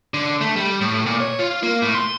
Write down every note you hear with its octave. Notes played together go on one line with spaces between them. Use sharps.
D3
A3
G3
A2
A#2
C#5
F4
A#3
A2
C6